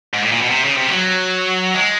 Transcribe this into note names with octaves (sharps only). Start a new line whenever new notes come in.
G#2
A2
A#2
B2
C3
C#3
C3
F3
F#3
G#3